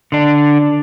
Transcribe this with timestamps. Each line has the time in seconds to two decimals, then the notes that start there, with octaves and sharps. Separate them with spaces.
0.12 D3 D4